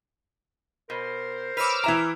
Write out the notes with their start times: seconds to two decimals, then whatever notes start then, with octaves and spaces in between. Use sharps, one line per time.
0.90 B2 A#4 C5
1.57 B4 C#5 D6 E6 F6
1.84 E3 E4 A#5